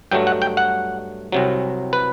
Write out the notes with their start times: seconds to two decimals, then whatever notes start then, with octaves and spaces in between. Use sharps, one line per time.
0.11 G2 F#3 A3 G5
0.27 F#5
0.42 G5
0.57 F#5
1.32 C2 C3 F#3
1.93 B4